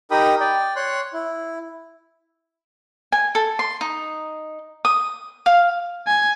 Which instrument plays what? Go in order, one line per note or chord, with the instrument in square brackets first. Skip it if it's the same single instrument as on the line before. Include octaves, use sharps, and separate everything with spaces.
[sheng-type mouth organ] D#4 G4 A#4 G5 B5 D#6
D5 G5
C#5 C6 F#6
E4
[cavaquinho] G#5
A4
C6
D#4
D#6
F5
[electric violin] G#5